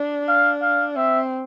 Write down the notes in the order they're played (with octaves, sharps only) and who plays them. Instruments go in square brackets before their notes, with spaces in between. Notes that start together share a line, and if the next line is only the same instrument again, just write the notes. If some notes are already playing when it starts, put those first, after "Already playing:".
Already playing: [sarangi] D4
[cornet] F5
F5
[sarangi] C4 [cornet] E5